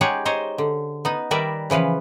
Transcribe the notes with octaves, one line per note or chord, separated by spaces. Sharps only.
G#3 D#4 G4 G#4 C#5 F#5
D#4 C5 C#5 D#5
D3
B3 D#4
D#3 G3 A#4 B4 D5 E5
C#3 E3 F3 B4 F5